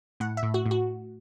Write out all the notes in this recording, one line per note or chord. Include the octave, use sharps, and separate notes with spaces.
A2 F#5
E5
A2
F#4
A2
F#4